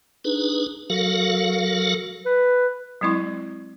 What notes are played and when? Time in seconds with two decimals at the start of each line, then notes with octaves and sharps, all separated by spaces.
0.25 D4 D#4 G#4 B4
0.90 F#3 F#4 A4 A#4 F5
2.26 B4
3.01 F#3 G#3 C4 E4 C#6